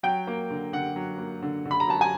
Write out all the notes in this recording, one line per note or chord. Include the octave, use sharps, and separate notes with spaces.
F#3 G5
A#3
D3
D3 F#5
F#3
A#3
D3
D3
B5
A#5
F#3 A5
G#5